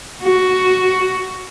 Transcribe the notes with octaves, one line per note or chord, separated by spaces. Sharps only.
F#4